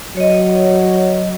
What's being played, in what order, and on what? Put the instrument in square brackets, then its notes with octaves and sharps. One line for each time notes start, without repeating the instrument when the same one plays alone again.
[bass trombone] F#3 [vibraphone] C#5 D#5